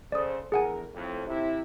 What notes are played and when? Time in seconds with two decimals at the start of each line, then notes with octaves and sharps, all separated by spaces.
0.12 C#3 A4 C5 D5 D#6
0.52 E2 D3 G#4 A#4 F#5 G#5
0.95 F2 A2
1.27 C3 E4